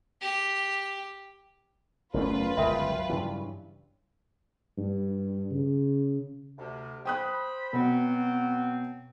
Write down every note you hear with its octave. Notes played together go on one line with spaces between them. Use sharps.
G4
F#1 E2 F#3 A3 C#4 F4 A#4 B4
G1 C#2 F#2 A#4 E5 G5 B5
G2 C#3 E3
G2
C#3
D2 C3
C5 G5 B5 D#6 F#6
B2 F#3 B3 C4